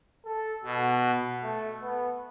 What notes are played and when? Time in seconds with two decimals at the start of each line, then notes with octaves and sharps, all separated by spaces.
0.25 A4
0.64 B2 F#4
1.43 A3
1.82 B3